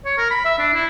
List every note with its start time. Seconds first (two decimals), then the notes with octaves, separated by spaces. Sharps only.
0.05 C#5
0.17 A#4
0.30 B5
0.45 E5
0.58 D4
0.74 E4